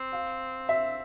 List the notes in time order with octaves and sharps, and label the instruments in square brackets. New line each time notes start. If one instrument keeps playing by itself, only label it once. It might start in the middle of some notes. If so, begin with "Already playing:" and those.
Already playing: [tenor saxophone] C4
[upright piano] F5
E5